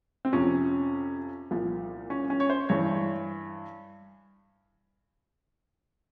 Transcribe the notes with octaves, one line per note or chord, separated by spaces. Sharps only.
C4
F2 C3 F3 C#4
C2 A#2 F3
C#4
C#4
C#5
C5
G2 E3 C#5